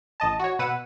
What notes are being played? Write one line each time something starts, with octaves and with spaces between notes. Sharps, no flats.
A1 D#5 A5
F#4 C#5
B2 B4 F#5 E6 D#7